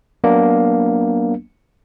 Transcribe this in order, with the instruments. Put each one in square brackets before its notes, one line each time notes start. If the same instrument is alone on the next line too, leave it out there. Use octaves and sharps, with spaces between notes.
[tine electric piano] F#3 A#3 B3 D4